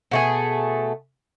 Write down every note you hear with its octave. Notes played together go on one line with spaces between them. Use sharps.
B2 A3 G#4